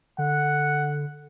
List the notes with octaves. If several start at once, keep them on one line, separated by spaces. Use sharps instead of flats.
D3 F#5